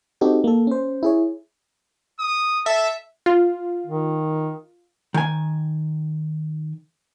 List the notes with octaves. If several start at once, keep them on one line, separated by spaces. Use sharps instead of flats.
C4 D#4 F#4 G4 A4
A#3 A4
C#4 C5
E4 G#4 C#5
D#6
A4 E5
F4
D#3
D#3 G#5